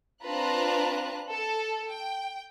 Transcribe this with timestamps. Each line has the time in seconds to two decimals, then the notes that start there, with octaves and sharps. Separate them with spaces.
0.23 C4 D4 F4 B4 A#5 F#6
1.31 A4
1.90 G5